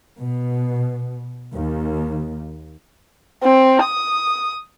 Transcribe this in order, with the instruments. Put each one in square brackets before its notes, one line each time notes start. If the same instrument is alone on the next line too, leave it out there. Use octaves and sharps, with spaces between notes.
[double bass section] B2
D#2
[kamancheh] C4
D#6